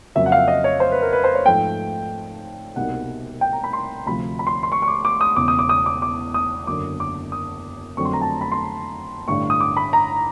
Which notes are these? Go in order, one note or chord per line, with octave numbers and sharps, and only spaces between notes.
F2 C#3 F#3 A#3 E5
F#5
F5
E5
D#5
C#5
C5
B4
A#4
B4
C5
C#5
G#2 F3 A3 G5
C2 B2 G3 A#3 D#4 F#5
G5
A#5
B5
C6
D2 C3 F3 B5
B5
C6
C6
C#6
C#6
D6
D6
D#6
E1 E2 C#3 D6
D#6
D6
D#6
D6
D6
D#6
F#1 F#2 D3 D6
D6
D#6
F2 D3 F#3 A3 C4 C#6
C6
A#5
A5
B5
C6
A1 G2 D3 C#6
D#6
D6
B5
A#5